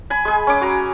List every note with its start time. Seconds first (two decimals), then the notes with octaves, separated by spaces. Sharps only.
0.10 G#5 B5
0.25 G#3 G#4
0.47 C#4 D6
0.61 F#4 A#5